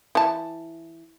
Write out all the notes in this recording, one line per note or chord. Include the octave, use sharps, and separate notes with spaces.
E3 A5